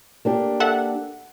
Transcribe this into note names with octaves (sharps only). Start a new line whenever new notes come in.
A#3 D4 G4
A4 E5 F#5